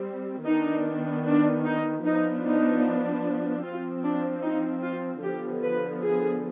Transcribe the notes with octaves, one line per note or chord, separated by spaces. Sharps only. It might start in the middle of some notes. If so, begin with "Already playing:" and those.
Already playing: G3 C4
D#3 B3 D4 D#4
D4
D#4
F3 B3 D4 D#4
D#4
F3 C4 F4
D4
D#4
F4
D3 F3 B3 G4
B4
G#4